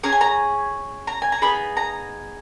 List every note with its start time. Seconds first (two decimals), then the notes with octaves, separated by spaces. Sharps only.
0.03 C#4 G#4 A#5
0.12 G#5
0.21 A#5
1.07 A#5
1.22 G#5
1.32 A#5
1.42 B3 D#4 G#4 B5
1.77 A#5